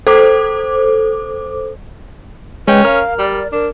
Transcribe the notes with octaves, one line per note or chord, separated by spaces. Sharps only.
A4 C5 D6
G#3 C#4 B4 G5
A#4 F5 F6
G3 D5
D4 A#4